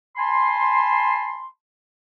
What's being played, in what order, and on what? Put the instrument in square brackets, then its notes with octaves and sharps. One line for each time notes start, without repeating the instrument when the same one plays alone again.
[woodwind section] G#5 A5 B5 C6